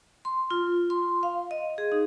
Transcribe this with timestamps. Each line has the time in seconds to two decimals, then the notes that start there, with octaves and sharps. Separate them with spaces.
0.25 C6
0.50 F4
0.90 C6
1.23 F5
1.51 D#5
1.78 G#4
1.92 D#4